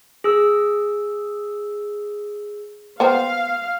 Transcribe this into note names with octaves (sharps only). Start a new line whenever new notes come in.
G#4 E6
B3 C5 F5 G5